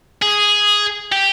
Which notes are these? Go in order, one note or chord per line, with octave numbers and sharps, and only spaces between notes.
G#4
G4